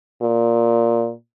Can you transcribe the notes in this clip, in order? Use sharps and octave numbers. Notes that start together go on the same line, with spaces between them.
A#2